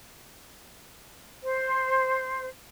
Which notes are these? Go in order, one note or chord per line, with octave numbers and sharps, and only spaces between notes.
C5